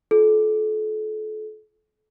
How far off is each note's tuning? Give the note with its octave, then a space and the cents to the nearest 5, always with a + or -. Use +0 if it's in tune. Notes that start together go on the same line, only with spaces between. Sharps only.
F4 +0 A4 -35